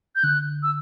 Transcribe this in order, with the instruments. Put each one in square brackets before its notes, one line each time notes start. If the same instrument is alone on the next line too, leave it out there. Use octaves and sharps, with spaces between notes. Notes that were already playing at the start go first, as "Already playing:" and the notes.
[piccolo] G6
[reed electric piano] D3 [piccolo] F#6
[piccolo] E6